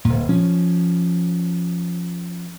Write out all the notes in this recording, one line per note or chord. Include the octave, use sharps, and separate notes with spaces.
D1 A#2
F3 C#4